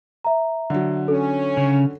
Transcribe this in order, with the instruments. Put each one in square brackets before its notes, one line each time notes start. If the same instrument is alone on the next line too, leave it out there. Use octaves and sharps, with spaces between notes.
[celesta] E5 A#5
[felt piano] D3 F#3
[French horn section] C#4 [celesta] A4
[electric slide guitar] C#3